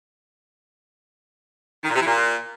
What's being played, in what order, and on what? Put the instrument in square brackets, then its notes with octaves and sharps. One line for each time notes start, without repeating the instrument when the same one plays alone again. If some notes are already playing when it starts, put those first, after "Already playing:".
[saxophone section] D#3
A#2
C3
E3
A#2